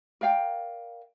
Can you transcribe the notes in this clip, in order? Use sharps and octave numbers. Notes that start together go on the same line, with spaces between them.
A#4 D5 F5 G5